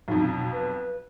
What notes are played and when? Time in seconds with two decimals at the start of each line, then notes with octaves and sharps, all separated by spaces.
0.08 B1 F2 D#4
0.25 B2
0.52 B4